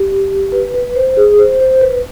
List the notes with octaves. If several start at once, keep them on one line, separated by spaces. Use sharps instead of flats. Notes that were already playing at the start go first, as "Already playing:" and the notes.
Already playing: G4
B4
B4
C5
G#4
C5
C5
B4